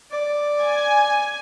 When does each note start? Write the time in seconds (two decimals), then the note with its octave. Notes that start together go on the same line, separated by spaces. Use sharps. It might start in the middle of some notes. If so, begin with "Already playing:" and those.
0.11 D5
0.62 G#5